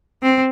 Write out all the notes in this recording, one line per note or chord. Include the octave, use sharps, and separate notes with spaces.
C4